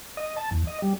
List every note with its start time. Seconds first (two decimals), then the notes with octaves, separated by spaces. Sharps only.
0.17 D#5
0.36 A5
0.51 E2
0.67 D#5
0.82 G3